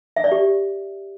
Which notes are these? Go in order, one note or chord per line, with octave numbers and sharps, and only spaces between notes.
E5
D5
G4